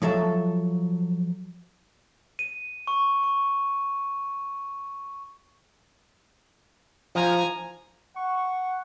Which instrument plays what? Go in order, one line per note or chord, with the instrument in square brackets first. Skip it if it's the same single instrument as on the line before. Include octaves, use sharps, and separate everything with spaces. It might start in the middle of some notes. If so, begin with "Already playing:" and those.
[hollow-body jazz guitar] F3 F#3 A4 E5
[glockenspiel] D#7
C#6
C#6
[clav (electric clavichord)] F3 [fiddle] G#5 A#5
[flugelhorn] F#5 [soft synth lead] C#6